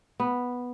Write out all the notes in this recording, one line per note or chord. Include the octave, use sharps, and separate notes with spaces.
B3